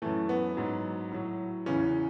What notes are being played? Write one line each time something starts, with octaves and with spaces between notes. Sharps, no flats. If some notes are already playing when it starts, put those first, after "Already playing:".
F#2 E3 A3
B3
G#2 F#3
A2 F#3
E2 C#3 E3 C#4